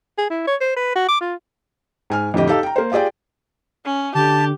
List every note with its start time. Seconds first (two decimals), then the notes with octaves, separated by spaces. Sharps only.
0.18 G#4
0.30 E4
0.47 C#5
0.61 C5
0.76 B4
0.95 F#4
1.08 D6
1.21 F4
2.10 G#2 G#5 F6
2.34 F2 A2 D3 G4 D#5
2.48 D#4 G4 A4 F5
2.63 G5 A#5
2.76 A#3 C5
2.92 F4 G4 G#4 D5 G5
3.84 C#4
4.15 D3 G4 A5